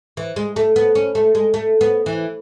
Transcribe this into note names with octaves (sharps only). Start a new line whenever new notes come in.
E3
G#3
A3
B3
C#4
A3
G#3
A3
B3
E3